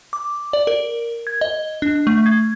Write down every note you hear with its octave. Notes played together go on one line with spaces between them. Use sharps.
D6
D5
A#4
G#6
D#5
D4
A3
G#6